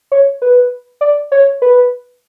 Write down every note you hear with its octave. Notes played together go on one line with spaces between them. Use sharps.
C#5
B4
D5
C#5
B4